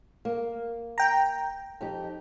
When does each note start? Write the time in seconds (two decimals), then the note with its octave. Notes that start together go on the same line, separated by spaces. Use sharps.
0.25 A#3
0.98 G5 A#5
1.81 F2 D#4 G4